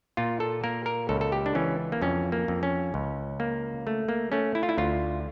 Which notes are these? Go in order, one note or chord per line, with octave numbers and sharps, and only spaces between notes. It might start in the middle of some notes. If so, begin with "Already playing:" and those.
A#2 F4
A4
A#3 A#4
A#4
C#2 A4
A4
G4
D4
E3 C#4
A#3
F2 C#4
A#3
F2
C#4
C#2
A#3
A3
A#3
A3 C#4
E4
F4
E4
D2 F4